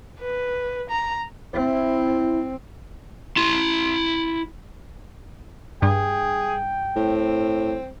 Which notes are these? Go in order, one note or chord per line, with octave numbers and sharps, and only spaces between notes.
B4
A#5
C4 E4
E4 C6
G2 G#4 G5
A2 C4